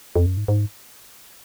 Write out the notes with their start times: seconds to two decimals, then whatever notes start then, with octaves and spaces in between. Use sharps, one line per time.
0.16 F2
0.26 F#2
0.37 G#2
0.48 G#2